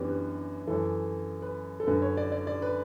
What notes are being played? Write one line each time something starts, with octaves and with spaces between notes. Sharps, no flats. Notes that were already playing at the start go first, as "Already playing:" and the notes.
Already playing: F#2 E3 B3 C#4 D4 G4
B4
F#2 E3 A4
B4
A4
F#2 D3 B4
C#5
D5
D5
D5
B4